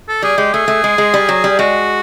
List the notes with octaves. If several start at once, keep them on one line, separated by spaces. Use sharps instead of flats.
A4
G3 G#4
G#3 G4
A3 G#4
A3
G#3
G#3
G3
F#3
G3
G#3 F#4